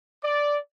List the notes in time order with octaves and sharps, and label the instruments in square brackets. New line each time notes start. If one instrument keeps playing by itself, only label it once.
[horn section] D5